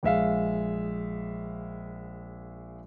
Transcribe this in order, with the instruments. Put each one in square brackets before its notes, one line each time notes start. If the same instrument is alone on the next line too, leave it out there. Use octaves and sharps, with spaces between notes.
[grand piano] A#1 G#3 E5 F5